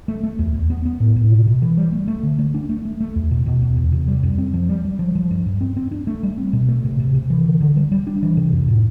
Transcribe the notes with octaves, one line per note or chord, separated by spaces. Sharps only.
A3
A3
E2
E2
B3
B3
A2
A2
B2
B2
E3
G3
A3
A3
D3
A3
D4
A3
A3
A3
E2
B2
B2
E2
E2
C3
G3
F2
C4
F3
G3
G3
F3
F3
G2
G2
C4
C4
D4
A3
G3
C4
B2
A3
C3
C3
C3
E3
D3
D3
G3
G3
D4
E3
C3
F2
A2